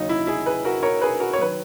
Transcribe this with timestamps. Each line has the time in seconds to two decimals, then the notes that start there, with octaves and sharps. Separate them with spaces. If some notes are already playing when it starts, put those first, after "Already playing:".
Already playing: D#2 C#3 F#3 D#4
0.09 E4
0.27 E4 G#4
0.46 G#4 B4
0.65 F#4 A#4
0.83 A#4 C#5
1.01 G#4 B4
1.20 F#4 A#4
1.33 C#5
1.38 D#3 F#3 B4